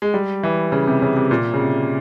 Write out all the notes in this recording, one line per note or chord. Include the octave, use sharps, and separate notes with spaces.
G#3
G3
E3
C#3
C3
C#3
C3
A#2
C#3
C3